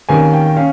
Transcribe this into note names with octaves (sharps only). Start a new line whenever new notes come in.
C3 D#3 A#3 C#4 G#5
G5
G5
C#4 F5